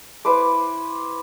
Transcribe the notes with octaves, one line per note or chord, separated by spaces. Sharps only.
E4 B4 C5 D6